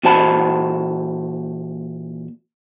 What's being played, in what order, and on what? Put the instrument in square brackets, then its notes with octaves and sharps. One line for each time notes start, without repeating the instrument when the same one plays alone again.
[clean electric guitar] A#2 E3 F#4 C5 A5 B5